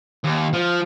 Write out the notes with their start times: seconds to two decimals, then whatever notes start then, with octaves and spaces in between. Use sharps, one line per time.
0.24 D#2
0.53 F3